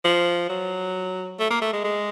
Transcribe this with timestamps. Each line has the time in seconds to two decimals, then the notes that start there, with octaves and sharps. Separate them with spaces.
0.05 F3
0.49 F#3
1.39 A3
1.50 A#3
1.62 A3
1.73 G#3
1.84 G#3